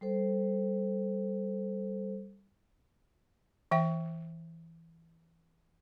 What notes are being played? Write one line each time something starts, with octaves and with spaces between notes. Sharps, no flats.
G3 A4 C5
E3 E5 G5